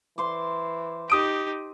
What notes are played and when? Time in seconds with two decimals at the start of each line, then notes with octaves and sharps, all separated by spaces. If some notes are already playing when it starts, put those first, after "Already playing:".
0.18 E3 C5 C6 D6
1.10 D#4 G4 D#6 D7